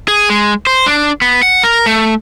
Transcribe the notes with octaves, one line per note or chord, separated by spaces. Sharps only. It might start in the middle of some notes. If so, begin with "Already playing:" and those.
G#4
G#3
C5
D4
B3
F#5
A#4
A3